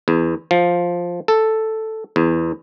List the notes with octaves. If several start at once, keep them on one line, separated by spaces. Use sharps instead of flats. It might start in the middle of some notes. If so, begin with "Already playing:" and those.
E2
F3
A4
E2